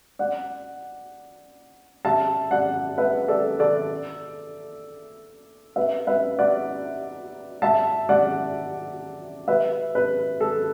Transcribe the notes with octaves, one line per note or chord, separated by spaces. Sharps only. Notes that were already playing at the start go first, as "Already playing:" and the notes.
D5 F#5
E5 A5
D5 F#5
B4 E5
A4 D5
A4 D5
B4 E5
B4 E5
D5 F#5
E5 A5
D5 F#5
B4 E5
B4
A4